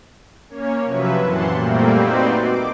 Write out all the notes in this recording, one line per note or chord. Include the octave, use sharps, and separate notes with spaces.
A#3 C#4 C#5
C3 F3 F#3 B4 E5
F#2 A#2 E3 F#5 A5 C6
A#2 G3 A3 A#3 C4
C4 D#4 F#4 B4 C5 D5
D6